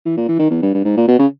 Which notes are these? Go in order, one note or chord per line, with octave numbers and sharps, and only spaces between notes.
E3
A#2
E3
D#3
E2
G2
G2
G#2
A#2
B2
C#3